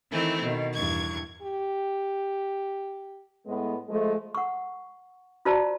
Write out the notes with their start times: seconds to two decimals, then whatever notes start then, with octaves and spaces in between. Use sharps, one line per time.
0.11 D#3 E3 A3 C4 E4
0.42 B2 D#3
0.73 E2 G2 C#6 G#6
1.42 G4
3.47 A2 G#3 B3
3.89 F3 G#3 A3
4.35 F#5 C#6
5.45 F4 F#4 C5 D5 A5 A#5